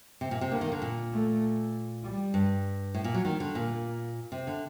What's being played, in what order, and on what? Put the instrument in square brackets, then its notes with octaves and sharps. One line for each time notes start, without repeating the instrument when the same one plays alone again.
[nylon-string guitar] C3
A#2
C3
[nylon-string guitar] D3 [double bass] A#3
[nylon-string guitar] D#3
D3
A#2
[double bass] A3
G3
[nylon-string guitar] G2
A2
A#2
F#3
[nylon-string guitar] D#3 [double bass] G3
[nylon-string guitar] D3
[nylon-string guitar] A#2 [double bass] A#3
[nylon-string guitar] C3
D3